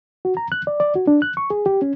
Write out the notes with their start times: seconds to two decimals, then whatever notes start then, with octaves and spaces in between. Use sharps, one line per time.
0.25 F#4
0.37 A#5
0.52 F#6
0.67 D5
0.80 D5
0.95 F#4
1.07 D4
1.22 F#6
1.37 C#6
1.50 G#4
1.66 G4
1.82 C#4